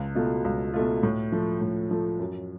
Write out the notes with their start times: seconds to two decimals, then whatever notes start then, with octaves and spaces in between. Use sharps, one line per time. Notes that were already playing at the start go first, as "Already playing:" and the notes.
Already playing: C#2
0.15 B2 A3 F4
0.45 C#2
0.74 B2 A3 F4
1.03 A2
1.32 F3 A3
1.61 A2
1.91 F3 A3
2.19 F#2